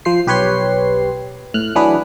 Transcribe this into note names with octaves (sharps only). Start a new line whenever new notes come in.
F3 C5 C7
B1 G4 B4 C#5 C6 C7
A2 F6 F#6
E3 F#3 D4 G#4 B4